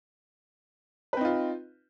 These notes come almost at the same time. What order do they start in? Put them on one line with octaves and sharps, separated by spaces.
B4 C4 D#4 F4